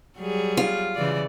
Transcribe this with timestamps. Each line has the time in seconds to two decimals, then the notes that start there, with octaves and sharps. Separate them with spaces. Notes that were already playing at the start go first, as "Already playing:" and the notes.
0.19 F#3 G3 G#4
0.57 F4
0.95 C#3 E3 D5